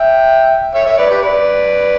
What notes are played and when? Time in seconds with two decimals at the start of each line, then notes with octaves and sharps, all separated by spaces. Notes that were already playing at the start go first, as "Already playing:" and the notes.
Already playing: E5 G5
0.74 C#5 E5
0.85 C#5 E5
0.98 B4 D5
1.09 G4 B4
1.22 B4 D5